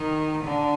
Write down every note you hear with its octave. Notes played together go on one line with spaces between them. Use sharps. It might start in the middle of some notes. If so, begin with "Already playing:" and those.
Already playing: D#3
D3